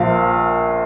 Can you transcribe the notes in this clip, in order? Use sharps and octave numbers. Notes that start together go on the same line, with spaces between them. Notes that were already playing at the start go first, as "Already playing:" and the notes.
Already playing: A#1 A#2 F3 F5